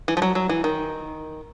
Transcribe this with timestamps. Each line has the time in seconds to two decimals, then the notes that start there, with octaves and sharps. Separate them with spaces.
0.08 E3
0.17 F3
0.22 F#3
0.35 F#3
0.49 E3
0.64 D#3